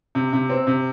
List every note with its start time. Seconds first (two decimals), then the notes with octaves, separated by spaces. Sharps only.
0.15 C3
0.33 C3
0.49 C4
0.67 C3